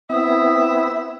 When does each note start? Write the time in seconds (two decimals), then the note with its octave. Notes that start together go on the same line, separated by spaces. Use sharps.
0.10 B3 C4 E4 E5 D#6